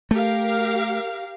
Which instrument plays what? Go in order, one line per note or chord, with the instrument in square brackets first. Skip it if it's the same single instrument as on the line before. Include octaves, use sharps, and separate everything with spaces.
[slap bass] A3 [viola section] G4 A#4 F5